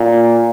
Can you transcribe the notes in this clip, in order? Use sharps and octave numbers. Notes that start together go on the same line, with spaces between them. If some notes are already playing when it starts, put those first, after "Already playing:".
Already playing: A#2